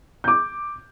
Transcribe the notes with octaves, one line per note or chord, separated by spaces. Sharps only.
D6 G6